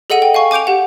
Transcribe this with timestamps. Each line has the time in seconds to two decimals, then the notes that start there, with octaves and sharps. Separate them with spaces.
0.10 G#4 A4 D#5 F#5 D#7 F#7
0.22 G5
0.34 F5 G#5 C#6
0.51 G#5 D6 G6 D7 F7
0.67 G4 F#5